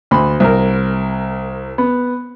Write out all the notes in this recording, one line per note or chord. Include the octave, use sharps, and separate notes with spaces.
D2 B5 C6
C2 A#4
B3